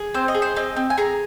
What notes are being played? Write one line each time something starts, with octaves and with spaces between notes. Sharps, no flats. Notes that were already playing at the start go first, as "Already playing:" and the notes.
Already playing: G#4
C4 C5
D#5
G#4
C5
C4 D#5
C4
G#5
G#4 A#5